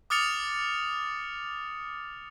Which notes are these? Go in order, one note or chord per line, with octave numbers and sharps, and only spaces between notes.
D6 D#6 F6 A6 C#7 F7